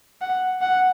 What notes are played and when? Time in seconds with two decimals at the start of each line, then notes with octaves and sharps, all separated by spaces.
0.21 F#5
0.62 F#5